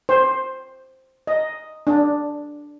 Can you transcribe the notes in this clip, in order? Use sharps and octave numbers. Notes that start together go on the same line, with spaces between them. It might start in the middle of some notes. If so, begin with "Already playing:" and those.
C5
D#5
D4